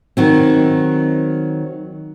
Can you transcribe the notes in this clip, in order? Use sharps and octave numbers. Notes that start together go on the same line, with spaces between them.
D#3 F#3 C4